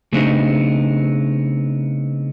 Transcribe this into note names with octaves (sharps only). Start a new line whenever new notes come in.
C#3 A3 B3 C4 D4 D#4